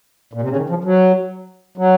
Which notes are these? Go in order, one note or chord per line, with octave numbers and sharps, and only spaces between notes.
A#2
C3
C#3
D#3
F3
F#3
F#3